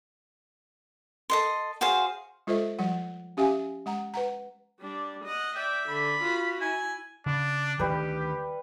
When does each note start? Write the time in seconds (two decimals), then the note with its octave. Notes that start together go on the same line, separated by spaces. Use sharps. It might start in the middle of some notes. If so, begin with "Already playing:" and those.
1.30 A4 D#5 C6
1.81 F#4 G#4 C5 F5
2.47 G#3 F4 A4 C5 D#5 E5
2.79 F3 G3 F#5
3.37 C#4 G4 E5 F5 G#5
3.86 G#3 F#5 A#5
4.14 B4 F#5 A#5
4.80 G3 D4
5.24 D#5 F#5
5.56 D5 E5 G5
5.89 D3 B5
6.22 F4 F#4
6.61 E4 G#5
7.26 C#3 D4
7.79 D2 D#3 G3 D4 G4 B4